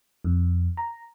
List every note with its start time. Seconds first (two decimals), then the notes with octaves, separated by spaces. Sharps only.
0.24 F2
0.77 A#5